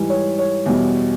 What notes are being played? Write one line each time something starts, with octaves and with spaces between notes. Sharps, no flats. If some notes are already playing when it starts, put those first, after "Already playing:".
Already playing: G#2 E3 G3
C#5
C#5
E2 B2 G3